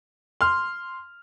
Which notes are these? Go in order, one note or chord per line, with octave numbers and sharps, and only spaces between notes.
C6 F6